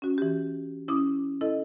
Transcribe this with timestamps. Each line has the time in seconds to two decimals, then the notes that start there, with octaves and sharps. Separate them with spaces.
0.02 C#4 F#4
0.18 E3 G4
0.88 C#4 E4 D6 D#6
1.41 E4 A4 D#5